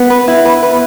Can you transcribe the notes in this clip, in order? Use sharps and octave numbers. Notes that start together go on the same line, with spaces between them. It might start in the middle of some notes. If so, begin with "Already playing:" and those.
Already playing: B3
B4
E4
B4
B4